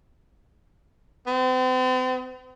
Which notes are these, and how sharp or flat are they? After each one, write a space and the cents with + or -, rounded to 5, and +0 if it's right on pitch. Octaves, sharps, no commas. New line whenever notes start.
C4 -40